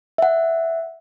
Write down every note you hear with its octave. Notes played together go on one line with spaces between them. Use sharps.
E5 F#5